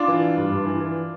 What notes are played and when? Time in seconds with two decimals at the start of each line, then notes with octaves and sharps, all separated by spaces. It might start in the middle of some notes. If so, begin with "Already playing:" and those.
Already playing: D4 F4
0.08 E3
0.22 E3
0.37 G2
0.52 G2
0.65 E3
0.81 E3